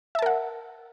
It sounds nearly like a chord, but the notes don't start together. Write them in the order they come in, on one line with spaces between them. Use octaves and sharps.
E5 A5 A#4 F#5